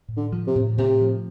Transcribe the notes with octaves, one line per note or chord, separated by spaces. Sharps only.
A2
D3
F3
C3
A2
A2 C3
F3